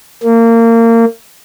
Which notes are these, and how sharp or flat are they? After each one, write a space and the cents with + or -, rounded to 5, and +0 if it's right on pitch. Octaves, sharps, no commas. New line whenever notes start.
A#3 -25